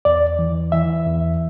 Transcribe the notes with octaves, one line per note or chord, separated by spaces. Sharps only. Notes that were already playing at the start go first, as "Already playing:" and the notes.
E2 D5
E3
E3 E5
E2